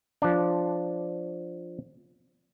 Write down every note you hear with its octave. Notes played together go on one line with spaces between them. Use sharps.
F3 D4